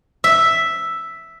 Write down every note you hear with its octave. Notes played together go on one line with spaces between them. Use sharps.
E5